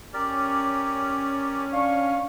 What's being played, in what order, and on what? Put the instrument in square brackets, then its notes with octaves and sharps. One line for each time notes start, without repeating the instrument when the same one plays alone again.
[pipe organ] C#4 [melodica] G4 A#4 D5
[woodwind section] D4 F5 C#6